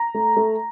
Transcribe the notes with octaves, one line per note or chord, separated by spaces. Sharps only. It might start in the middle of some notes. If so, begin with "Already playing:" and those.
Already playing: A#5
A3
A3